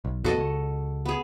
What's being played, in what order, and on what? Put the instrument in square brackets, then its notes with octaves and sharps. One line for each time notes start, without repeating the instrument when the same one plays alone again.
[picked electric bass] B1
[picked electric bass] E2 A#2 B3 [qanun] F#4 A4 D#5
[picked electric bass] C#2
[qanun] B3 G#4